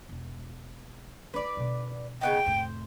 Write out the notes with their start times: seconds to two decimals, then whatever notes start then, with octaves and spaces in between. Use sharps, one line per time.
0.09 E1
1.34 D4 D#4 B4 D5
1.57 B2 D3
2.21 C#3 B3 D#4 G5
2.46 F1 A2 C5